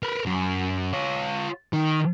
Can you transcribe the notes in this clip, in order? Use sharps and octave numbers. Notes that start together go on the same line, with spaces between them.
A#4 B4
F#2
F4 C#5
D#3